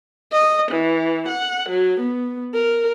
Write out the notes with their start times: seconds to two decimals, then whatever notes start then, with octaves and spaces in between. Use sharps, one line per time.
0.32 D#5
0.71 E3
1.28 F#5
1.69 F#3
2.00 B3
2.54 A#4